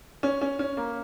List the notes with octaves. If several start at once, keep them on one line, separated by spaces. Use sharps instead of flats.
C#4
C#4
C#4
A#3